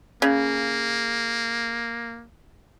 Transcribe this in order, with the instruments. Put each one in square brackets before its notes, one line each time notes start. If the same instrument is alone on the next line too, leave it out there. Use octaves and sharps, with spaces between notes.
[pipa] C#3 [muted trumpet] A#3